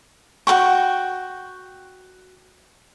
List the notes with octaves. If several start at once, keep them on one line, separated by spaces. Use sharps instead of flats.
F#4 A#4 G5 C#6